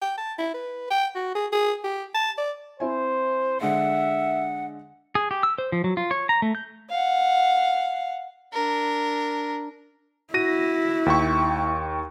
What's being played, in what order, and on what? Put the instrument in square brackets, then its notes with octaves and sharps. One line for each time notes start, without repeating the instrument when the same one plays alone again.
[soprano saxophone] G5
A5
E4
B4
G5
F#4
G#4
G#4
G4
A5
D5
[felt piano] C4 E4 G#5 [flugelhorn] C5
[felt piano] D3 G#3 [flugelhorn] E5 [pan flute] F#5
[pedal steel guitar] G#4
G4
E6
C5
F3
F#3
F4
C#5
A#5
A3
G6
[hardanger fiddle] F5 F#5
D4 A#4
[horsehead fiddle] E4 [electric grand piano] F#4 A#6 D#7
[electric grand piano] D#2 G5 C#6